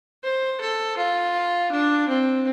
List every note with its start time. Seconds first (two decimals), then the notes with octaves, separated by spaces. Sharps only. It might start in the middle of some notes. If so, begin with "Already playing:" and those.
0.24 C5
0.61 A4
0.97 F4
1.72 D4
2.09 C4